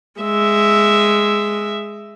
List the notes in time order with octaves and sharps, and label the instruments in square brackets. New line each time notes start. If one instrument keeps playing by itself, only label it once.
[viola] G#3 E5